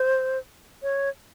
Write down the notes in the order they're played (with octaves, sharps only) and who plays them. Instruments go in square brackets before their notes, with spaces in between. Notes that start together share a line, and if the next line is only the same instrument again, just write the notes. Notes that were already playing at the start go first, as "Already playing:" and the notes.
Already playing: [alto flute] C5
C#5